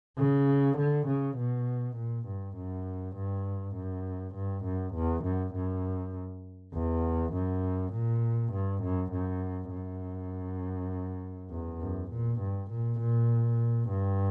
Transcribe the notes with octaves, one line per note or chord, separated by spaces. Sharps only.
C#3
D3
C#3
B2
A#2
G2
F#2
G2
F#2
G2
F#2
E2
F#2
F#2
E2
F#2
A#2
G2
F#2
F#2
F#2
E2
F#2
A#2
G2
A#2
A#2
G2